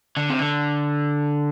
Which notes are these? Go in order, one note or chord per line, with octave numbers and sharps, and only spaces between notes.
D3
C3
D3